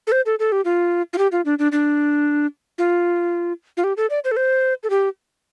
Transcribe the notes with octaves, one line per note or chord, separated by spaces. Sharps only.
A4
C5
A4
A4
G4
F4
F4
G4
F4
D4
D4
D4
F4
F4
G4
A4
D5
C5
A4
C5
A4
G4